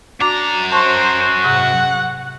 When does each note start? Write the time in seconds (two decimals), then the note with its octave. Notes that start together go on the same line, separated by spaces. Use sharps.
0.20 F#2 D4 F#4 A#5 D6
0.72 F#4 C5 A5 C6 C#6
1.44 G#2 C3 F#5